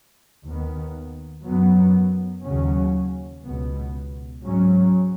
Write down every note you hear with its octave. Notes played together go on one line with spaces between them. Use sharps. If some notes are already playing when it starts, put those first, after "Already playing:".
D#2 D#3 B3
F#2 F#3 B3
D#2 C#3 F#3 C#4
C#2 B2 B3
G#2 F#3 C#4